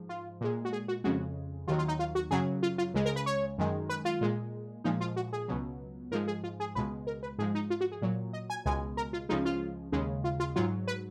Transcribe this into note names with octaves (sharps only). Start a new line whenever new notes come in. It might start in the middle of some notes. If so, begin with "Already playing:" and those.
Already playing: G#2 F3
F4
A#2 G#3
F#4
G#4
F#4
F2 C#3 G#3 F#4
D#2 D#3 F#3 F4
F4
D#4
F4
F#4
F#2 C#3 F#3 G#4
F4
F4
C#2 C#3 G#3
A#4
B4
C#5
F#2 D#3 G#3
B4
F4
A#2 G#3
A#2 F3 G#3 D#4
F4
F#4
G#4
C#2 B2 F#3
G#2 F3 G#3 A#4
G#4
F4
G#4
C#2 B2 G#3 B4
A#4
B4
G#2 F3 G#3 G#4
D#4
F4
F#4
G#4
A#2 F#3
D#5
G#5
C#2 B2 G#3 G#5
A#4
F4
C#2 C#3 F3 G#3 D#4
F4
D#2 C#3 G#3
F4
F4
G#2 F#3 F4
B4